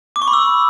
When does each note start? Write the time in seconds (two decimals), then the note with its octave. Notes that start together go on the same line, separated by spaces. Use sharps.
0.16 D6
0.22 C#6
0.28 B5
0.33 E6